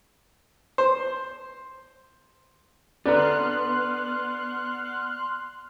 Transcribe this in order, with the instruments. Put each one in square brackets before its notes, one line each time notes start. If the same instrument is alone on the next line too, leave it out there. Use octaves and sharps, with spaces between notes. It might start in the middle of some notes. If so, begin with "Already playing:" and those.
[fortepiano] C5
[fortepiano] D3 B4 A#5 [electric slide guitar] B3 [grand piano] D5 [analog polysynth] C6 F6 F#6